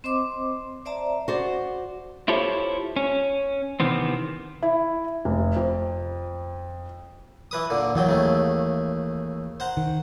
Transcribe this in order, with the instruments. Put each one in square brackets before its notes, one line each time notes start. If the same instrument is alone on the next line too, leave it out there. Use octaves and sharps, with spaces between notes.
[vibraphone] C4 C5 D#5 C6 D6
C5 D5 E5 A5 A#5
[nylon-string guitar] F#4 C5 D5
[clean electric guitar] E4 F4 G4 A4 C5 C#5
C#4
C3 D#3 E3 B3 C4
[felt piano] E4
F1
F2
[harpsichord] E3 B4 D#6
A#2 D3
[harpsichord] D#2 F#3 G5 [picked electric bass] E3
[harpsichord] D#2 C#3 A3
C5 F#5 A#5
[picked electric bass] D#3